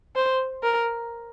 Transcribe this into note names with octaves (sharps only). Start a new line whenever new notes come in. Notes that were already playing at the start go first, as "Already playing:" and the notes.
C5
A#4